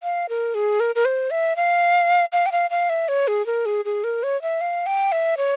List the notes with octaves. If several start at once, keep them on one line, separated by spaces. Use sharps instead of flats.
F5
A#4
G#4
A#4
A#4
C5
E5
F5
F5
G5
F5
F5
E5
C#5
G#4
A#4
G#4
G#4
A#4
C#5
E5
F5
G5
E5
C#5